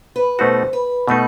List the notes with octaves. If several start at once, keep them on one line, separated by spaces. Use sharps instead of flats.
B4
B2 A3 D#4 F#4 C5
B4
B2 A3 D#4 B4